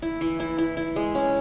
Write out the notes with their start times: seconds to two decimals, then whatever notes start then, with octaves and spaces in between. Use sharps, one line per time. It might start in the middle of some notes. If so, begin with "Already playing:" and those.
0.02 E4
0.21 E3
0.40 E4
0.58 E4
0.77 E4
0.96 G#3
1.15 C#4